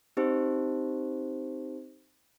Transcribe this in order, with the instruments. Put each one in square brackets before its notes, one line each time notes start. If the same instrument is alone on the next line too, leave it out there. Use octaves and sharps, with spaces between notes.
[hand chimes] C4 D#4 G4 C5